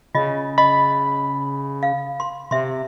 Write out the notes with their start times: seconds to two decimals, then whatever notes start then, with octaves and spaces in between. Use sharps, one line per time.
0.15 C#3 F4 D#5
0.58 D#5 B5
1.83 F5
2.20 C6
2.51 C3 E5 C6